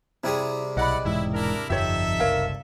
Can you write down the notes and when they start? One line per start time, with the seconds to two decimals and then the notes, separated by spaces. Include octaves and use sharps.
0.24 C3 G3 E4 G#4
0.77 B1 E4 D5 D#5 F#5 B5
1.05 E1 G#2 E3 E4
1.34 D4 E4 A#4
1.70 G1 F2 F3 D#4 G4 A4 C#5 E5
2.20 F#1 C2 A#4 C#5 F5